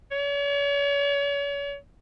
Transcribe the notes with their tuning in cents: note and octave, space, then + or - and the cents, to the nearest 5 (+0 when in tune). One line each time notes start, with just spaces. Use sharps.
C#5 +40